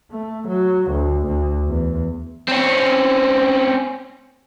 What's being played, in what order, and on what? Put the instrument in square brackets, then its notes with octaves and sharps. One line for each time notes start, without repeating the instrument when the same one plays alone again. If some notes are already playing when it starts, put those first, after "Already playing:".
[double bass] A3
F#3
D2
D2
E2
[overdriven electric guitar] C4 C#4